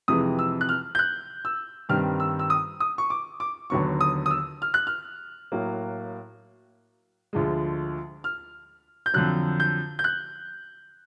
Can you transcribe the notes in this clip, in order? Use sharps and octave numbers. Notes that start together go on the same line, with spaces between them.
F2 C3 E3 G#3 D#6
E6
F#6
F6
G6
F#6
E6
G2 D#3 G3 C4 F6
E6
E6
D#6
D#6
C#6
D6
D6
D#2 D3 F#3 B3 C#6
D#6
D#6
E6
F6
F#6
F6
A2 F#3 A#3
D2 D3 F3 G#3
F6
G6
F2 D3 F#3 F#6
G6
G6
F#6